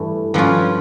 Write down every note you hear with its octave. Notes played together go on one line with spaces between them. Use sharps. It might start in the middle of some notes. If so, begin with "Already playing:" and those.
Already playing: G2 E3 A3
G2 F3 C#4 F4